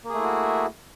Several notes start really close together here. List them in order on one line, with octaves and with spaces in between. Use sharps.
A#3 G#4 A3 E4 F#4